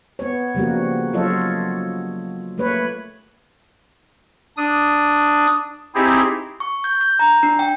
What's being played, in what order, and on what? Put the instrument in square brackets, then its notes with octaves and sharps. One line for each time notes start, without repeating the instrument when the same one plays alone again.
[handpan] B3 C#5
C#3 F3 G3 A#3 F#4
F#3 F4 A4 C#5 D#5
A3 A#3 B4 C#5
[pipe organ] D4 D#6
C4 D#4 E4 G4 G#4
[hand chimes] C#6
G6
G6
A#5
D4
G5